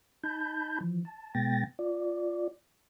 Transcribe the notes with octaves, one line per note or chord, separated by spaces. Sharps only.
D#4 A5 B5 G6
E3 F3
A5
B2 G#3 B3 G5 A6 A#6
F4 D5